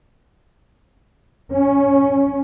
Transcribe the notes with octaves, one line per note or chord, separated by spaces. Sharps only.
C#4